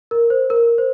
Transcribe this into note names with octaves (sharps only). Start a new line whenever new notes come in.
A#4
C5
A#4
C5